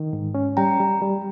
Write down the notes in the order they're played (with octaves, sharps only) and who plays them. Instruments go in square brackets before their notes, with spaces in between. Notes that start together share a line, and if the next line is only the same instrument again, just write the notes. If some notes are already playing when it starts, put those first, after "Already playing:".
Already playing: [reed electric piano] D#3
G#2
C#4
[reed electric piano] G3 [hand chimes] G5 A#5
[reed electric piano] G3
G3